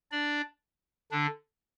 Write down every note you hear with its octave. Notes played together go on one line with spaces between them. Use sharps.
D4 D5
D3 D4